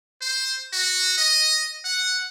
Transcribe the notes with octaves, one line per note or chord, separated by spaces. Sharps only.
C5
F#4
D#5
F#5